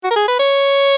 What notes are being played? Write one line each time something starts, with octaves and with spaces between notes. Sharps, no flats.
F#4
A#4
G#4
B4
C#5